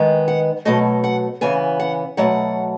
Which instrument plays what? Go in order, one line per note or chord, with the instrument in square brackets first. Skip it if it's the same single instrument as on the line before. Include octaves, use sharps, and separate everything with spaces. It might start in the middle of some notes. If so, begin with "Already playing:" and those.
Already playing: [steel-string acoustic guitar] D#3 G#3 B3
F#5
B2 F#3 A3 D#5
F#5
C#3 E3 B3 G#5
F#5
B2 F#3 A3 F#5